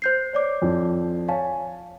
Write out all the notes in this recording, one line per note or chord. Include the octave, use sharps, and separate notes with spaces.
C5 G6 C7
C#5 D5 D6
F2 F3
C#5 F5 G#5 A5